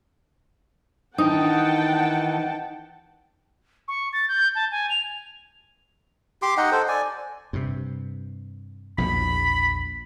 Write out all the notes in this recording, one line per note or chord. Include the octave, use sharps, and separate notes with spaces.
D#3 E3 D4 D#4 F#5 G5 A5 D#6
C#6
A6
G6
A5
G#5
F7
G4 C6 D6
D#4 D#5 F#5 G5
A4 C5
D5 G#5
G2 C3
A#1 E2 B2 B5